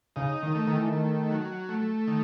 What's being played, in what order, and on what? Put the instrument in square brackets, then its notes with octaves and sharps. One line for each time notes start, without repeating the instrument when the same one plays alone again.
[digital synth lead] C#3 [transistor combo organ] D#4
[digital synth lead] D#3
[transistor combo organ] A3
[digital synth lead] D#3
E3
D#3
[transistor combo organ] A3
F#3
A3
D#3